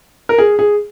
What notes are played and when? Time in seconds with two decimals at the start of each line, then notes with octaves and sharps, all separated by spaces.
0.29 A#4
0.38 G#4
0.59 G#4